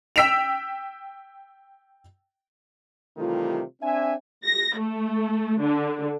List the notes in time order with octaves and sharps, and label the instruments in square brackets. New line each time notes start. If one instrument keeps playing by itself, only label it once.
[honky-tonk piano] G5 E6 B6 D7 E7 F7
[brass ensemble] C3 D#3 E3 G3 A3 F4
C4 D4 E5 G#5
[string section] A#6
A3
D3